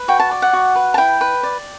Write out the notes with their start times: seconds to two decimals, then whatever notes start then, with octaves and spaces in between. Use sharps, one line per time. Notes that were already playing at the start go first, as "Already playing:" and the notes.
Already playing: B4
0.08 F#4 G5
0.20 A5
0.31 D5
0.42 F#5
0.53 F#4
0.75 B4
0.94 A5
0.98 E4 G5
1.21 B4
1.43 D5